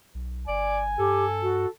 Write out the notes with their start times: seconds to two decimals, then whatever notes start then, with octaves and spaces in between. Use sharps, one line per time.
0.14 B1
0.48 G1 D5 G#5
0.99 G2 G4 A4
1.42 F#4